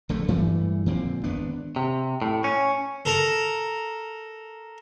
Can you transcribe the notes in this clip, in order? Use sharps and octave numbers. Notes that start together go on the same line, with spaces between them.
A#1 D3 A3
G2 E3 G3 A3
F2 A#2 D3 C4
G#1 B3 D4
C3
A2
C#4
A4 A#4